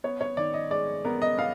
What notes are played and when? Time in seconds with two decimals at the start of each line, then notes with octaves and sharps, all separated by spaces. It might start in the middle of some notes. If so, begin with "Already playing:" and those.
0.04 B3 C#5
0.21 C#5
0.37 D#3 D5
0.54 D#5
0.71 G#3 D5
1.05 B3 A#4
1.22 D#5
1.38 B3 F5